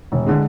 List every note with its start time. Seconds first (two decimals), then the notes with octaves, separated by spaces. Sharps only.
0.12 E1
0.26 D3 G#3